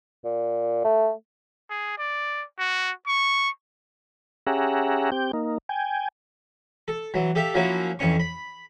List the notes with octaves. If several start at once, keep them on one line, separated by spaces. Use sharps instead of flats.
A#2
A3
G#4
D5
F#4
C#6
C#4 G4 G#4 E5 F#5 A#5
C4 G4 G6
A#3 D#4
G5 G#5
A4
E3 F#3
G4 A4 E5 F5
F3 F#3 A#3 C#4 E4 F#4
F2 E3 C#4 C#6
B5